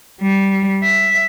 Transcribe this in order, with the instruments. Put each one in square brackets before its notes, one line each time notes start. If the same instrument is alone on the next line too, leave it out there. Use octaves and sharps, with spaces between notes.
[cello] G3
E5